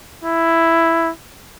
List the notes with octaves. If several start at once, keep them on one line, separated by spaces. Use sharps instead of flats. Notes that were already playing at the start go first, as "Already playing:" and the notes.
E4